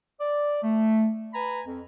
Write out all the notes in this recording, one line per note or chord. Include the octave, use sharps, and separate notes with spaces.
D5
A3
B4 G#5 A#5 B5
F2